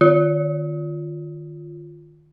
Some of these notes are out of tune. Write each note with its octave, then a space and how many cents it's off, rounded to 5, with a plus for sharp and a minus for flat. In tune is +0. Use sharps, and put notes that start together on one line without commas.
D#3 -40 F4 +0